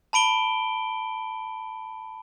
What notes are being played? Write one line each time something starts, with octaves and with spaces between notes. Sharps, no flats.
A5 B5 D7 G7